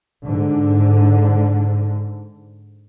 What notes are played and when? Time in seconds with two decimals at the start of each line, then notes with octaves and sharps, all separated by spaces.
0.24 G#2 D3